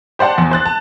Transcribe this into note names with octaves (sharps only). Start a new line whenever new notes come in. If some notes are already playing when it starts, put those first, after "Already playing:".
G4 C5 D5 F#5 A5
E2
C5 F#6 A6
A5